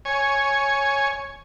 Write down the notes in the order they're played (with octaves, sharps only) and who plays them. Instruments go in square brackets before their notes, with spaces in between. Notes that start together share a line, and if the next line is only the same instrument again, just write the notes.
[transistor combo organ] C#5 G#5